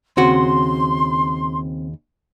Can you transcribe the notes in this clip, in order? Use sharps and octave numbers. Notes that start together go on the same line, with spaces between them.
D#2 C#3 C4 F#4 C6